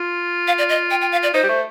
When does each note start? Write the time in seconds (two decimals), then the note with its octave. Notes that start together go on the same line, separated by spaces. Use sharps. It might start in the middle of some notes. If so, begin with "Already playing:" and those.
Already playing: F4
0.48 F5
0.58 D5
0.69 D#5
0.91 G5
1.02 G5
1.12 F5
1.23 D5
1.34 D#4 C5
1.43 G3
1.49 A3